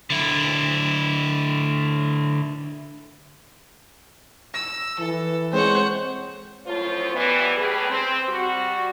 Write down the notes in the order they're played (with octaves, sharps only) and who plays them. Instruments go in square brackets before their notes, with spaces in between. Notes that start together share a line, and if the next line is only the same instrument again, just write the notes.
[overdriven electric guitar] D3 E4
[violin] E6 [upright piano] A#6
[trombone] E3 [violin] A4
[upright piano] G#3 C4 [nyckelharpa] C5 [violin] C#5 F#5
[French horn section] F#2 A2 F3 F4 C5 C#5
E3 G3 B3
A2 G3 G4 G#4 B4
C4
G3 F#4